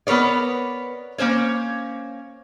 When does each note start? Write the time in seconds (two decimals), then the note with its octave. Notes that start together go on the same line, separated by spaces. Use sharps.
0.07 B3 A#4 B4 C#5 D5
1.18 A#3 C#4 C5 C#5